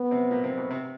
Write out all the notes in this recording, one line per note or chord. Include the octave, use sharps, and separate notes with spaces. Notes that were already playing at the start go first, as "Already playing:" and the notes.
Already playing: B3
C3 C4
A#2 A#3
C3 C4
B2 B3
C3 C4